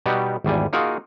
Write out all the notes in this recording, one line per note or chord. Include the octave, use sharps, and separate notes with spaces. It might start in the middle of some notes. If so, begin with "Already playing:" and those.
B2 G3 B3 D#4 F#4 G4
G#1 E2 G3 G#5
A#3 D#4 F4 F#4 G#4 A#4